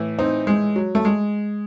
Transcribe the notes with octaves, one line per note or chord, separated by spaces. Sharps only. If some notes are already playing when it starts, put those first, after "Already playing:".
Already playing: A2 E3
C4 D#4
G#3
F#3
A3
G#3